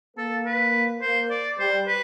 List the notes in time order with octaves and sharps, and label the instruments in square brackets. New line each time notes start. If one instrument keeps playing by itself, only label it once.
[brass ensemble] A#3 [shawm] A4
[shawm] B4
[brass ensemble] A#3 [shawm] C5
[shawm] D5
[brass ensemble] G3 [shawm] C5
[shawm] B4